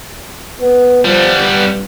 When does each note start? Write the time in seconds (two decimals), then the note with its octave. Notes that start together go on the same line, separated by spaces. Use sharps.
0.60 B3
1.05 F3 G3 B3
1.39 G2